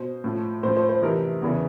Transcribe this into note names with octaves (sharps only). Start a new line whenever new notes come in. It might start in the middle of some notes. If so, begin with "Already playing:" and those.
Already playing: B2 C5
A2 F3
A2 F3 C5
C5
C5
F2 C3 E3 A#4
E2 C#3 E3